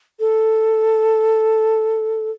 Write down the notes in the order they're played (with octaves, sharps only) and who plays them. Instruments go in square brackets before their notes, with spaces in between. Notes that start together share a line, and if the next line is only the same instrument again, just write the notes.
[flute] A4